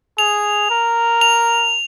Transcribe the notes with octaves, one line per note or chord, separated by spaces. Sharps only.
G#4 F7
A#4
F7